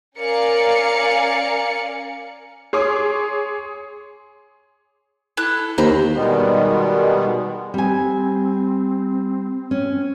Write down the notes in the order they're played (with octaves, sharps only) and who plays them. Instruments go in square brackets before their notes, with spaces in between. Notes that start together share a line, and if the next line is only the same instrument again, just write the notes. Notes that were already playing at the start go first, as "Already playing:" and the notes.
[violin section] C#4 A#4 D5 F5 G#5 C#7
[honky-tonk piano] G#4 C#5 C6 D6 D#6
[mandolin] E4 A4 F#6
[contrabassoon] D#2 [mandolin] C5 A#5 B5
[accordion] B2 D#3 G3 G#3 B3
[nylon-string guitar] G3 G#5 [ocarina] C4
[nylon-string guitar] C#4